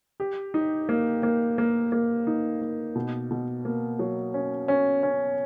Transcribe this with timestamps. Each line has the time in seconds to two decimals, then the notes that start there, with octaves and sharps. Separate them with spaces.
0.20 G4
0.54 D#4
0.89 A#3
1.23 A#3
1.58 A#3
1.92 A#3
2.27 D#4
2.61 A#3
2.95 B2
3.31 B2
3.65 A#3
3.99 F#3
4.34 C#4
4.68 C#4
5.03 C#4